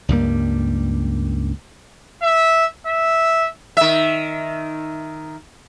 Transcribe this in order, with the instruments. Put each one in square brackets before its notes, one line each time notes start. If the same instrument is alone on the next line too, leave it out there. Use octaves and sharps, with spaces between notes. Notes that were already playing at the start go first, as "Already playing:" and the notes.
[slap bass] C#2 G2 G3 A#3
[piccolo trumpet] E5
E5
[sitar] D#3 E5